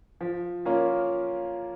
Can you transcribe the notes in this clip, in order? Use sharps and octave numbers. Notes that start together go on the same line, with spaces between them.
F3
A#3 C#4 F4 A#4